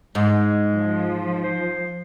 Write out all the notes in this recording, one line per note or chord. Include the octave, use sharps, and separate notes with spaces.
G#2 G#3
F3
C5